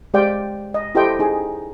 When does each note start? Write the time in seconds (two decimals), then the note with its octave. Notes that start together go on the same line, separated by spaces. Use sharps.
0.14 G#3 G4 C5 D5 F5 G5
0.74 D#5
0.95 E4 G4 A4 C5 D#5 G5
1.19 D#4 G#4